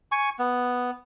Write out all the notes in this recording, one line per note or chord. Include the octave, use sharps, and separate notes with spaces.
G#5 C#6
B3